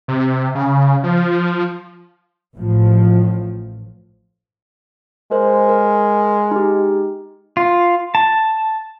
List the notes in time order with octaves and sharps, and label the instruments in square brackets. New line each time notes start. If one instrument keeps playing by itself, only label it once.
[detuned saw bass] C3
C#3
F3
[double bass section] A1 A2 F3
[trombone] G#3 [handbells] A#4 C5
[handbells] A#4
D#4 G4
[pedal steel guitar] F4
A5